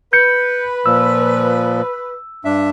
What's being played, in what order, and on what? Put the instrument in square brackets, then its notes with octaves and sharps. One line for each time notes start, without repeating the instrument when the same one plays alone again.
[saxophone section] B4 [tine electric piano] G6 C#7
[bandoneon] A#2 F3 [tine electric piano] E6
[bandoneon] G2 D4 E5